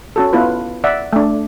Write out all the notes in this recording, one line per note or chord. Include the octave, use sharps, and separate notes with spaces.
C#4 F#4 A4
B3 E4 F4 B4
D5 E5 F#5
A3 D4